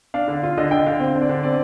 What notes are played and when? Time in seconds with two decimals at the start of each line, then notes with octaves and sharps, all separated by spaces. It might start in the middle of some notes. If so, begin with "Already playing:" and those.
0.14 D4 F5
0.28 D3
0.43 F4
0.58 D3 D#5
0.71 D3 G5
0.86 D3 F5
1.00 C4
1.15 D3
1.22 D5
1.29 D3
1.43 C4 D5